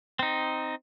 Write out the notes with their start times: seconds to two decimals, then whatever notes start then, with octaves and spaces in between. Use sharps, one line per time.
0.19 C4 D#4